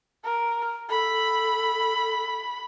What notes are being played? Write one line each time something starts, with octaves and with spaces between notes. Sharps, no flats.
A#4
A4 B5